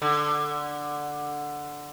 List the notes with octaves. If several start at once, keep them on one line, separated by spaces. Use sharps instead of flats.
D3